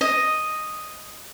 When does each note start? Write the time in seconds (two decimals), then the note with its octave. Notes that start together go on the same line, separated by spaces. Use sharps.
0.01 D#5